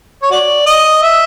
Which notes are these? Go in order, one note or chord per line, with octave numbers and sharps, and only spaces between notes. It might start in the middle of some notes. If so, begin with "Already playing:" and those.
C#5
F#4 D5
D#5
E5